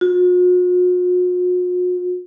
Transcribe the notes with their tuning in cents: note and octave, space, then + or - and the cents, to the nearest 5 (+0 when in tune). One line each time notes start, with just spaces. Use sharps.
F#4 -45